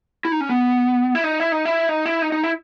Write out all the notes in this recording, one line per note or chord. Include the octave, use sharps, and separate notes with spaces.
E4
D#4
C#4
B3
E4
D#4
E4
D#4
E4
D#4
E4
D#4
D#4
E4